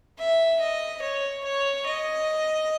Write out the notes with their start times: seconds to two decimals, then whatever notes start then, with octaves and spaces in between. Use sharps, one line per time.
0.19 E5
0.61 D#5
1.02 C#5
1.44 C#5
1.86 D#5